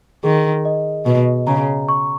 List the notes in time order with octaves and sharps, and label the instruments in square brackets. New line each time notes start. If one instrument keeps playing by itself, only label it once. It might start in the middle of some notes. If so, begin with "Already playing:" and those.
[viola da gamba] D#3 [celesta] G#4
[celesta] D#5
[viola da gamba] B2 [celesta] D#5
[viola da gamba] C#3 [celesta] A#5
[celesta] C#6